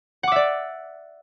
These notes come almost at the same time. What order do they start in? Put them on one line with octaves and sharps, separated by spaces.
F#5 D6 E5 D5